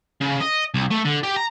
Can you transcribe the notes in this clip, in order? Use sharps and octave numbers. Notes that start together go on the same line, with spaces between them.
C#3
D#5
C2
A3
D3
G4
A#5